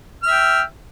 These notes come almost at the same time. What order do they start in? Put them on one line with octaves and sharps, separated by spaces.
F6 E5 G5